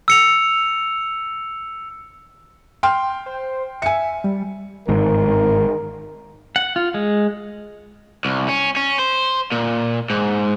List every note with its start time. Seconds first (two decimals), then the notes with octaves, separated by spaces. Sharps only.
0.08 E6 C#7 F7
2.83 G5 C6 F6
3.26 C5
3.82 E5 G#5 C#7
4.24 G3
4.88 G1 G#2 D#3 A#4
6.56 F#5
6.76 F4
6.94 G#3
8.25 C2
8.49 C#4
8.76 C#4
8.99 C5
9.52 A#2
10.10 G#2